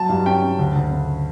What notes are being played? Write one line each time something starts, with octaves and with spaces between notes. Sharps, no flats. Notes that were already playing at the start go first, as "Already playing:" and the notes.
Already playing: F#3 A5
G2
C#4 G5
C#4
D2
D2
C#3